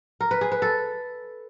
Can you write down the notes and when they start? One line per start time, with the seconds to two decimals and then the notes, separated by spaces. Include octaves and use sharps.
0.20 A#4
0.31 B4
0.41 G#4
0.52 B4
0.62 A4